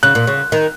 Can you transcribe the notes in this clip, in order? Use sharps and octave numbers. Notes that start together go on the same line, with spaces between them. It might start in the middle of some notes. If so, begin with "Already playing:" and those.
C#3 F#6
A#2
C#3
D#3